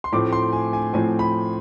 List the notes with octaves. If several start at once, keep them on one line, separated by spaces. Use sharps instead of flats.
C6
A2 F3 A3 C4 D6
C6
G#5
G#5
A2 F3 A3 C4 G#5
B5